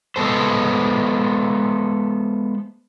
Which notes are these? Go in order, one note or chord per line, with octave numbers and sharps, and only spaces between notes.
G#3 B3 A4 C5